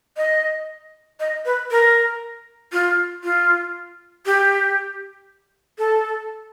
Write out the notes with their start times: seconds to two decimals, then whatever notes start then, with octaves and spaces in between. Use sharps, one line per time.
0.17 D#5
1.20 D#5
1.45 B4
1.71 A#4
2.72 F4
3.24 F4
4.26 G4
5.78 A4